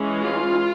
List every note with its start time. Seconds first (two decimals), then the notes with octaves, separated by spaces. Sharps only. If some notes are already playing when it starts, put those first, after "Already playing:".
Already playing: E3 G#3 C#4
0.22 F4